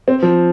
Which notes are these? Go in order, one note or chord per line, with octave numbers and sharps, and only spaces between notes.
C4
F3